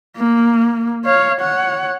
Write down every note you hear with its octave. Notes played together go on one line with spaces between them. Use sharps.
A#3
C#5 F5
C#5 F#5